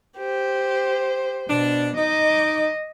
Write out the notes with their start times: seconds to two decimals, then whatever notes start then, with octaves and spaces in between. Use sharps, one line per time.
0.18 G4 C5
1.49 B2 D4
1.97 D#4 D#5 D6